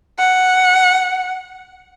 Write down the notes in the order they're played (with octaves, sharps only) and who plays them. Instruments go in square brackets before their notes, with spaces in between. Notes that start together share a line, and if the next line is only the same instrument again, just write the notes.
[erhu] F#5